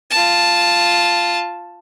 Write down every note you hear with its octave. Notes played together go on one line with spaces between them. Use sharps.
F4 A5